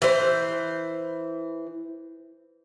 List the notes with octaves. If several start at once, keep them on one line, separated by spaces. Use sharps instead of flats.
E3 C5